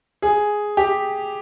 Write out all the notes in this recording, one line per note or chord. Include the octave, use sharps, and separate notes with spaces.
G#4
G4